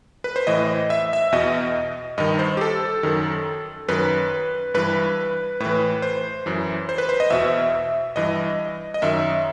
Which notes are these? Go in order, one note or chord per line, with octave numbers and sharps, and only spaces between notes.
B4
C5
A2 E3 D#5
E5
E5
E2 B2 D#5
G2 D#3 D#5
C5
G4
A4
F#2 D#3
F#2 D#3 B4
G2 E3 B4
A2 E3 B4
C5
F#2 E3
C5
B4
C5
D#5
E2 B2 E5
G2 E3 D#5
D#5
F#2 D#3 E5